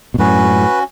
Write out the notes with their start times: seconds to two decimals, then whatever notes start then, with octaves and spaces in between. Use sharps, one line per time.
0.14 B2
0.18 F#2 A2 C#4 F#4 B4